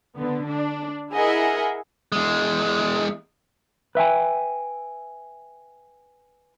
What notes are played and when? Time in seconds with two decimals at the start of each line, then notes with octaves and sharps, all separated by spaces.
0.17 D3 B3
0.49 D4
1.13 E4 G#4 A#4 D#5 E5 F#5
2.12 E2 G#3
3.95 B4 E5 G5 G#5